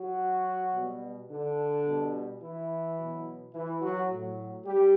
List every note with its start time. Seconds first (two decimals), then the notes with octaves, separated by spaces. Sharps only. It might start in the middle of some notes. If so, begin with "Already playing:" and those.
Already playing: F#3 F#4
0.74 B2 G3
1.30 D3 D4
1.86 B2 G3
2.41 E3 E4
2.98 B2 F#3
3.54 E3 E4
3.82 F#3 F#4
4.10 A2 F#3
4.66 G3 G4